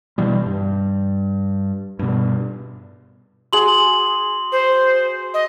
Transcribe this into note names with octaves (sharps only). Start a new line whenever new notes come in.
B2 E3 G3
G2
G2 B2
F#4 G#4 C6 F#7
C5
D#5